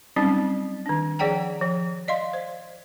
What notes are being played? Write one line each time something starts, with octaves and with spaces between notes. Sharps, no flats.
F#3 G3 C4 C#4 D#4
D#3 D4
F3 G#4 D5 F#5 G5 A#5
F3
D5 D#5 F5 C6
C5